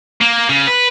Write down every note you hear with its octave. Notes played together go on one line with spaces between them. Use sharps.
A#3
C#3
B4